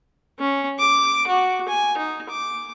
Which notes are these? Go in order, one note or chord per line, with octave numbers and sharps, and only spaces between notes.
C#4
D6
F#4
G#5
D#4
D6